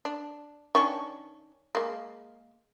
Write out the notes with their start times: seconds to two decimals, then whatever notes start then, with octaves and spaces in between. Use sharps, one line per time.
0.05 D4
0.75 D#3 C#4 D4 C#6
1.75 G#3 A#3